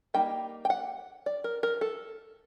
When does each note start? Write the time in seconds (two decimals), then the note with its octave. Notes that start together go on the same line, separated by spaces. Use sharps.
0.14 G3 A#3 D#4 G5
0.65 G5
0.70 F#5
1.26 D5
1.44 A#4
1.63 A#4
1.81 A4